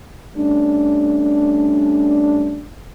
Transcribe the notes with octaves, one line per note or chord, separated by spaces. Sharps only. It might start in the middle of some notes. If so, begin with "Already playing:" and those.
G3 A3 C#4 D4